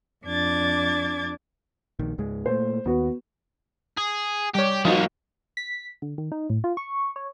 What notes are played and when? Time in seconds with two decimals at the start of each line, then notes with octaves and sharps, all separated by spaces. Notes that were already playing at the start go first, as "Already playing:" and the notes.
0.24 F2 D4 D6 G#6 A6
1.99 A#1 D#3
2.18 C#2 G#2 G#3
2.46 A#2 A3 C5
2.86 D#2 B3 F#4
3.98 G#4
4.55 G3 G4 C#5
4.85 F3 G3 A#3 D#4 F#4
5.57 B6
6.02 D3
6.18 D#3
6.32 D#4
6.50 A2
6.64 F4
6.77 C#6
7.16 C#5